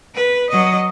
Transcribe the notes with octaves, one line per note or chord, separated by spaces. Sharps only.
B4
F#3 D#5